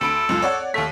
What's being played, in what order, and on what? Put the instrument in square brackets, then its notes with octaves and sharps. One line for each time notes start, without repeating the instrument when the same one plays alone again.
[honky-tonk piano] D2 B5 D7 [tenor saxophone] A4
[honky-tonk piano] C#2 F#2 F4
C#5 D5 F#5
[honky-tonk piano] D#2 B6 [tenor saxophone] A3